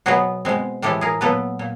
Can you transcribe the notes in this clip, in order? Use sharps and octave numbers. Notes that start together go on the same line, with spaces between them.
B2 F#3 B3 F#4 G#4
B2 G#3 C4
A2 E3 G#3 G4 A4
G#4 A#4
A#2 F#3 B3 A4 B4
A#2